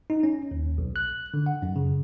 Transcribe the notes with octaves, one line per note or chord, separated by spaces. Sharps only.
D#4
C#4
D#2
B1
F#6
D3
F#5
F#2
C#3